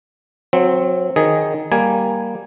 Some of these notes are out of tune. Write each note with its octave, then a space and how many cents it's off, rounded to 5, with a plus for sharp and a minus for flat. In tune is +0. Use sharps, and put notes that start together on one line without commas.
F#3 -25 C4 +0
D#3 +0 G#4 +0
G3 +0 A#3 +0 G#5 +0